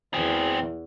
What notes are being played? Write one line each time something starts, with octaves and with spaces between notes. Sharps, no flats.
E2 E3 C4 G#4